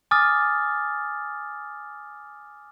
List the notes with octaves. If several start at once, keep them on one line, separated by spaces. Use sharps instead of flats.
G#5 D6 D#6 F6 A6